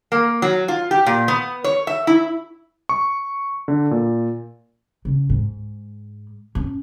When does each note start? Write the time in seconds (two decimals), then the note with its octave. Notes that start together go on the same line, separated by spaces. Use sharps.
0.12 A#3
0.42 F#3
0.68 F4
0.91 G4
1.06 A#2
1.28 B3
1.64 C#5
1.87 E5
2.07 E4
2.89 C#6
3.68 D3
3.91 A#2
5.05 C#3
5.30 G#2
6.55 C#4